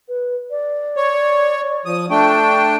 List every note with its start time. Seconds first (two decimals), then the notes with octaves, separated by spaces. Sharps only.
0.09 B4
0.51 D5
0.97 C#5
1.86 F3 D#6
2.10 A3 D4 G5 C#6